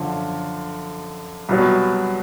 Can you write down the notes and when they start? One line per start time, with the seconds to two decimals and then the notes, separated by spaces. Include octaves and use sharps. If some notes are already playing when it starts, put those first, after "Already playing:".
Already playing: F#2 D3 F3
1.49 C2 B2 F#3